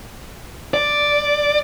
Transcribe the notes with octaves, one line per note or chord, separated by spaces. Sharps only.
D5